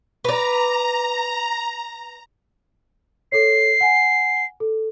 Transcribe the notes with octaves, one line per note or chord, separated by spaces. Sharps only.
B4 D5 A#5
A4 C#5 C7
F#5 G#5
A4